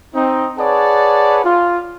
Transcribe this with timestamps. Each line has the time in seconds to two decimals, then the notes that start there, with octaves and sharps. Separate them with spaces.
0.14 C4 D#4
0.58 G#4 B4 C#5 D5 F#5 A5
1.44 F4